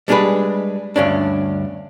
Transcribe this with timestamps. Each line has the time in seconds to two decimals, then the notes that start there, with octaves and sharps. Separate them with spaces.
0.08 G3 G#3 D4 G4 G#4 B4
0.96 D2 G2 C#4 D4